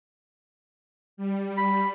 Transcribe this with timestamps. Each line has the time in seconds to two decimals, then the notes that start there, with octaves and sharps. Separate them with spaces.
1.17 G3
1.57 B5